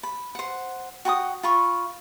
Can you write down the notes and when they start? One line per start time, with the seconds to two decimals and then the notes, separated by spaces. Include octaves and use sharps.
0.03 B5
0.35 C5 F#5
1.05 F#4 G5 B5 D#6
1.43 F4 B5 C#6